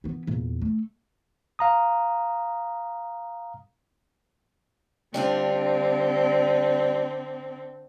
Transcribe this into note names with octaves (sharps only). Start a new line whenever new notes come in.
E3 B3
E2 A#2
A3
F5 A#5 D#6
D3 G3 C4 D4 F4